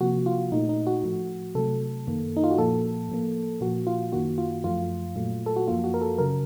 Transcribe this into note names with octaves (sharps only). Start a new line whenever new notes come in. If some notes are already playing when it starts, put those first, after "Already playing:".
C3 F3 A#3 F#4
F4
A#2 A3 D#4
D#4
F#4
A2 F3 A3
C3 F#3 A3 A4
F#2 D#3 A#3
D#4
F4
F#4
A#2 F3 A#3 A4
A2 F3 A#3
A#2 F3 A#3 F#4
F4
F#2 D#3 A#3 F#4
F4
F#2 F3 A3 F4
A#2 F#3 A3
A4
F#4
F#2 F3 A#3 F4
F#4
A#4
A4
C#3 F#3 A#4